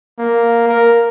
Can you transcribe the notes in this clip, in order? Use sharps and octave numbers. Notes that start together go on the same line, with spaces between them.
A#3
A#4